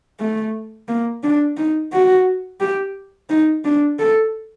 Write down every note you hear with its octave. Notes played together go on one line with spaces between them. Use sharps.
A3
A#3
D4
D#4
F#4
G4
D#4
D4
A4